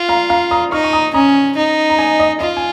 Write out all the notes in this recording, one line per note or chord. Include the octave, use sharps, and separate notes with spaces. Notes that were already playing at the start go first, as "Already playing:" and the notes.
Already playing: F4
F5 A#5
F5 A#5
A#5 D#6
D#4 C#6 F6
C#6
A#5 D#6
C#4 A#5 D#6
D#4
A#5
D#5 G#5
D#5
F4 D#5
G#5